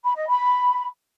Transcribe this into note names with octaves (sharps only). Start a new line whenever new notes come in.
B5
D#5
B5